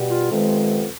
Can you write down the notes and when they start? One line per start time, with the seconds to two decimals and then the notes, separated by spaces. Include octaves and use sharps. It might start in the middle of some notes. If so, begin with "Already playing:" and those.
Already playing: B2 G3 B3
0.10 F4
0.30 F2 C3 D#3 G#3 B3